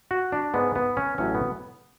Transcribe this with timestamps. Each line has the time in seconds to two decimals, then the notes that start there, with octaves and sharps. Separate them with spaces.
0.11 F#4
0.32 D4
0.54 G#2 G#3 B3
0.76 B3
0.97 C#4
1.18 A1 A2 F#3 C#4
1.34 B3